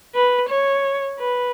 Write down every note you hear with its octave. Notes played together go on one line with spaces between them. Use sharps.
B4
C#5
B4